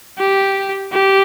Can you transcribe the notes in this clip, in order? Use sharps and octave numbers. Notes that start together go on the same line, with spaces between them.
G4
G4